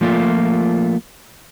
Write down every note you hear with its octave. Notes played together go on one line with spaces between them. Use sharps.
F3 A3 A#3 F4